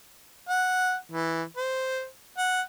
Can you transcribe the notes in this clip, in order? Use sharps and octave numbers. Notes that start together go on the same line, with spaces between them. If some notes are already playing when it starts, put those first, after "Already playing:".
F#5
E3
C5
F#5